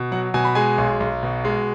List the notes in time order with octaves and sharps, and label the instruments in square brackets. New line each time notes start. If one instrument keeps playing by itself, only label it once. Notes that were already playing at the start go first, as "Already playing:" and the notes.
Already playing: [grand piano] B2
F#3 F#5
B2 G#5
B5
G#3 G#5
B1
B1
B2
G#3